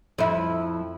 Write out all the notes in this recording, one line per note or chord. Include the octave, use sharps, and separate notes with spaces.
F2 E4